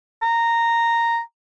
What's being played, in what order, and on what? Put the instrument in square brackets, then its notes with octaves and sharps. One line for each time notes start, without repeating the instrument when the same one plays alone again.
[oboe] A#5